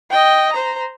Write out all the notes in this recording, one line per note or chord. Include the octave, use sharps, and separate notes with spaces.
D#5 G5
C5 A#5